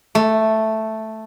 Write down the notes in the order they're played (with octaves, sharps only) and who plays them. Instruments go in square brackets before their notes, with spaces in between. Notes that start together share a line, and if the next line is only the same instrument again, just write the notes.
[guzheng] A3